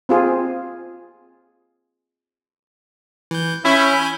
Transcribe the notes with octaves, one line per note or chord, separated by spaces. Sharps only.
C4 F4 G#4
E3 G6
C#4 E4 G#5 B5 G6